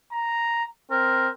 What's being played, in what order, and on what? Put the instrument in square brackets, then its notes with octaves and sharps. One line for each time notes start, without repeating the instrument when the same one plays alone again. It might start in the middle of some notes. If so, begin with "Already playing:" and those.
[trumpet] A#5
[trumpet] C4 [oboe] A#4